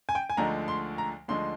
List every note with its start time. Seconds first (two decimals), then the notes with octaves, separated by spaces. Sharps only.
0.09 G#5
0.15 G5
0.30 G#5
0.37 D2 D3 F3 G#3 D#4 A#5
0.68 C6
0.98 A#5
1.28 D2 D3 F3 G#3 D#4 C6